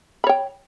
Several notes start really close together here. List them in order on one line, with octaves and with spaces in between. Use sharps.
B5 C#5 G5